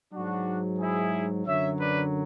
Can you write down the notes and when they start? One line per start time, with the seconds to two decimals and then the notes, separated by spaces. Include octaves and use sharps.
0.13 G#2 F#3 D4 F#4
0.79 E4 G#4
1.46 F#2 D3 F#3 C#5 E5
1.79 B4 D5